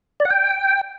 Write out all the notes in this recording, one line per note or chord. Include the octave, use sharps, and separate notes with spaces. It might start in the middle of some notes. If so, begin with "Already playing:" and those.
D5
F#5
G5